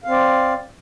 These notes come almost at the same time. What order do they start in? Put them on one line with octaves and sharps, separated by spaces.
F5 C4 D5